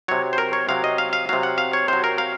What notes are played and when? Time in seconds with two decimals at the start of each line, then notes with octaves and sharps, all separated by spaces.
0.08 C3 F#3 C#5
0.33 C5
0.38 A#4
0.53 C#5
0.68 C3 F#3 F5
0.84 D#5
0.98 F5
1.13 F5
1.29 C3 F#3 F5
1.43 F#5
1.58 F5
1.73 C#5
1.88 C3 F#3 C5
2.04 A#4
2.18 F5